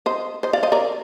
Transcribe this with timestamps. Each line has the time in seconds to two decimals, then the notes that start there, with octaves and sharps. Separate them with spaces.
0.06 C5 D#5
0.43 C5 D#5
0.53 D5 F5
0.63 C5 D#5
0.72 A#4 D5